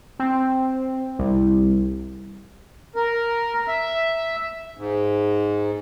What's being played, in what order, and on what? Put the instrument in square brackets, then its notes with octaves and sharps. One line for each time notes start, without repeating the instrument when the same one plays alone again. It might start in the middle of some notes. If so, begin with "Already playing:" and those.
[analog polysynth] C4
C2
[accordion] A#4
E5
G#2